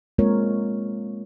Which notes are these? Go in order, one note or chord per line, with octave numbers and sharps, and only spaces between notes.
G#3 A#3 C4 F4 A#4 C#5